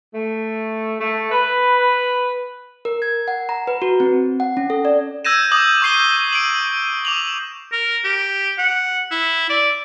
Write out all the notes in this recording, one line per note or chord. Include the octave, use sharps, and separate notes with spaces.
A3
A3
B4
A#4
G#6
F#5
A#5
B4
F#4
C4
F#5
C#4
A4
D5
E6 G6 G#6 A#6 D#7 E7
D6 D#6 G6 F#7
C#6 G6 C7 D#7 G7
D7 D#7 F#7
D6 F7 F#7
A#4
G4
F#5
E4
D5